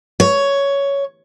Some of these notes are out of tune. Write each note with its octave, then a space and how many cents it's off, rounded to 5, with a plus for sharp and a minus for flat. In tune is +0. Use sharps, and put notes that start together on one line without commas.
C#5 +10